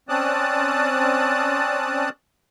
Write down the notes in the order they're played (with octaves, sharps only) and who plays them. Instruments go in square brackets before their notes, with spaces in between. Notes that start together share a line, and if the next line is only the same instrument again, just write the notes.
[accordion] C4 C#4 D5 A5 D#6 F#6